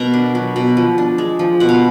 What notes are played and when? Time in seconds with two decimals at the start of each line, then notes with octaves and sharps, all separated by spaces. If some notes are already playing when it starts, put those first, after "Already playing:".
Already playing: B2 A#4 A#5
0.14 D4
0.35 F#3
0.56 B2
0.77 F3
0.98 D4
1.18 G#3
1.39 F3
1.60 B2 F#5
1.69 F5